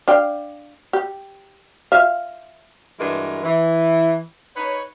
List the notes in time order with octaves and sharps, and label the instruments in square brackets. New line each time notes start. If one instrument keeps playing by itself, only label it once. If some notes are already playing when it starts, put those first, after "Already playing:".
[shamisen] D4 F5 G5
G4
F4 E5 F5
[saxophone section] G2 E3 G#3 F#4 A#4
E3
D#4 B4 C#5